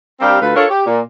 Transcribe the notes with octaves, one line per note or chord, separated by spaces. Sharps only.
G3 C4 D4 G4 A#4 F5
D2 F4 A4 B4
D4 F4 A4 A#4 C#5
G4
A#2